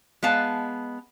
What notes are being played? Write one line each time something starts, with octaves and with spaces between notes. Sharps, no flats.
G#3 B3 F5 A5